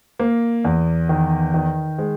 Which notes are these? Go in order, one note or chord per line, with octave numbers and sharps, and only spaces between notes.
A#3
E2
D#3
D#3
G#3